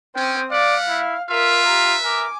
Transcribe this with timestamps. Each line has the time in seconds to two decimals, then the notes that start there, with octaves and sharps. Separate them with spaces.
0.16 C4 C#4 G5 D#6
0.51 G3 D5 F5 F#5
0.88 E4
1.30 F4 A#4 B4 E5
1.65 G4 A#5
2.04 A#4 G#5 D6